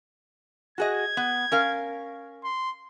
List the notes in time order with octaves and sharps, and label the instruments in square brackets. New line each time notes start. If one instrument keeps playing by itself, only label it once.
[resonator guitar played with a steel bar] F#4 G#4 D#5 [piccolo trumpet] G#6
[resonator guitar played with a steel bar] B3
C#4 A#4 F5
[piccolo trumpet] C6